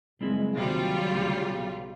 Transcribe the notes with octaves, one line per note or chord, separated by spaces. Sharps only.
F#1 G3 G#3 C4 E4
D#2 C3 F#3 G3 C4 F4 F#4
D2 C#3
B1